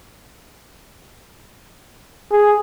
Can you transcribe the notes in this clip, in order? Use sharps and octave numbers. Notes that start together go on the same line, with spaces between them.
G#4